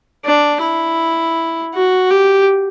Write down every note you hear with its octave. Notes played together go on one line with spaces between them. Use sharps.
D4
E4
F#4
G4